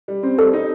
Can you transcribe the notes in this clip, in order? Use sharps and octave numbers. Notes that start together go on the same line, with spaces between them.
G3
C4
G3 A4
D#4